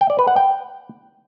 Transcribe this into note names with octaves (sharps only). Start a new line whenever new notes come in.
G5
D5
B4
F#5
G5